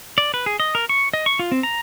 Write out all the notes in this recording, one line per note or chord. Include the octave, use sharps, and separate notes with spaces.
D5
B4
G#4
D#5
A#4
C#6
D#5
C#6
F4
C4
A#5